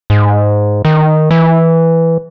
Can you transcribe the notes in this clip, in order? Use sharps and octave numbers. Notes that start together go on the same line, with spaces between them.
G#2
D#3
E3